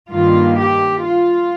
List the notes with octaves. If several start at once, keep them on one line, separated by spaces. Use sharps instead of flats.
G2 D#3 A#3 F4
G4
F4